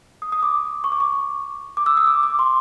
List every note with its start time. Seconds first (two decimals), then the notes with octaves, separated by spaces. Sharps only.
0.22 D#6
0.32 D#6
0.43 D6
0.84 C#6
0.92 D6
1.00 C#6
1.77 D6
1.86 E6
1.97 D#6
2.07 D6
2.23 D6
2.39 C6